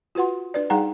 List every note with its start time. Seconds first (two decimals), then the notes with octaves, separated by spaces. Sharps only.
0.15 F4 F#4 B4 F#5 C6
0.54 D4 B4 D5
0.70 G3 D#4 G#4 F#5 G5 A#5